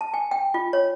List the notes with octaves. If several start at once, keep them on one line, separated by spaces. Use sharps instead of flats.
A5
G#5
G5
F4
C#5